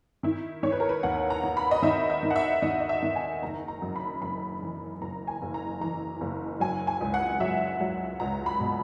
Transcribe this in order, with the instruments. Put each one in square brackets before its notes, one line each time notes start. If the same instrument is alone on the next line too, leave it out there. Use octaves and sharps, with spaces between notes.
[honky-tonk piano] D#3 E4
D#3 C#5
B4
A#4
B4
D#2 F#5
A#5
D#2
B5
D#5
D#3 E5
E5
D#3
F#5
E5
D#3 D#5
D#5
E5
D#3
G#5
F#1 A#5
A#5
F#2
B5
F#1 B5
E3
F#1 A#5
G#5
F#1
A#5
E3 A#5
F#1
F#3 G#5
G#5
C#2
F#5
F#3 E5
F#3
C#2 A#5
B5
B2